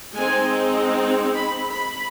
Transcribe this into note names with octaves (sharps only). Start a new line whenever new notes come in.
G#3 C4 D#4 G#5
B5
B5